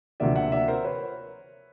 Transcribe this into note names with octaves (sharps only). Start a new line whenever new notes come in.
D2 C3 F3 A#3 D5 E5
E5 F#5
D5 E5
A#4 C5
B4 C#5